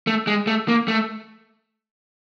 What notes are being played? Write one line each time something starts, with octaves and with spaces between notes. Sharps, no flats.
A3
G#3
A3
A#3
A3